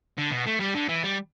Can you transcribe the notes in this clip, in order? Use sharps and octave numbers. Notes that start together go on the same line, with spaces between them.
D3
B2
A3
G3
D3
E3
G3